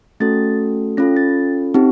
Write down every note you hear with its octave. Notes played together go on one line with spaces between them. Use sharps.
A3 C#4 F#4 A4 A6
C#4 F4 A4 A#6
A6
C4 D#4 G4